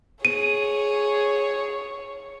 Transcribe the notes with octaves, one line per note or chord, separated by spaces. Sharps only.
G#4 C#5 D#7